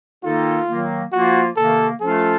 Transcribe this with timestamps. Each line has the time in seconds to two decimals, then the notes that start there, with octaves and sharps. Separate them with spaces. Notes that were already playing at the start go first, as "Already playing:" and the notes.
0.23 D#3 A#3 D#4 F4 A4
0.68 D#3 F#3 A#3
1.13 F3 A#3 F4 F#4
1.57 C3 D#3 A#3 A4
2.01 F3 A3 C#4 F4 A4